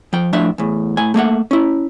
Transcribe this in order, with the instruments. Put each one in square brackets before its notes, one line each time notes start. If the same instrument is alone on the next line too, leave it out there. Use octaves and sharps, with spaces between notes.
[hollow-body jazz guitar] F3 G5
A2 F3 D4 E5
E2 A2
A2 G#5
A3 A#3 E5 F#5
C#4 E4